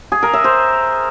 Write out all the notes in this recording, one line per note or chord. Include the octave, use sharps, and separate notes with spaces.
G#4
A#4
E5
C5